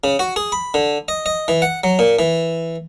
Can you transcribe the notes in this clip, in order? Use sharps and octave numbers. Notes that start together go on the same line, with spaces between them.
C#3
F#4
G#4
B5
D3
D#5
D#5
E3
F#5
F#3
A#2
E3